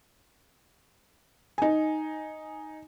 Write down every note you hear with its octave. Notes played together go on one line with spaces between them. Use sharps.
D#4 G#5